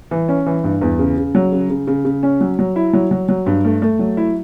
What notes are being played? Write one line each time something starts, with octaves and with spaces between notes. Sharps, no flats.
E3
C#4
E3
G2
E2
C#3
C#3
F#3
C#3
C#3
C#3
C#3
C#4
F#3
F#3
E4
F#3
F#3
F#3
G2
A3
A3
F#3
E4